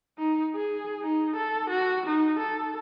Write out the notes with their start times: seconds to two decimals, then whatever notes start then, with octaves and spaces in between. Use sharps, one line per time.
0.19 D#4
0.55 G#4
1.03 D#4
1.36 A4
1.70 F#4
2.06 D#4
2.39 A4